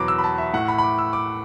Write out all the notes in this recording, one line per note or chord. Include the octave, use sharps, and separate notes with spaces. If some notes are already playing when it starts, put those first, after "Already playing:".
Already playing: E2 B2 F#3 B5 D6
E6
B5
A5
E5
A2 A3 F#5
B5
B5
D6
E6
D6